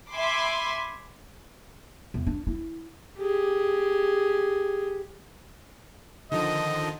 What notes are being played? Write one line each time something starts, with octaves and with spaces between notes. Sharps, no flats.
E5 G#5 B5 C6 D6
E2
D4
E4
G4 G#4
D3 D#3 F3 D#5